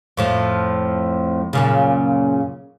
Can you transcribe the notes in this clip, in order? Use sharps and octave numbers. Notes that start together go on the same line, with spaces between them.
F2 A2 F3
F#2 A#2 C#3